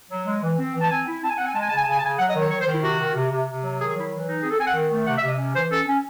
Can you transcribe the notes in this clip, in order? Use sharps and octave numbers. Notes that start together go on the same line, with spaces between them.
F#3
G#3
E3
C4
E3
A5
C4 G#5
E4
C4 A5
G#5
C4 F#5
G#5
G#3 A5
G#5
C#3 A5
G#5
C#3 A5
G#5
A5
C#3 G#5
F#3 F#5
D#5
D#3
C#5
D#3 C#5
C5
D#3
E4
C3 F#4
D#3
C3
C3
C3
F#3
D#3 G#4
G#4
F#3 E4
E3
D#4
C4 G#4
A4
C4 G#5
F#5
D#3
A3
C3 F#5
E5
C3
D#5
C#4
E3 C5
C#4 A4
C#4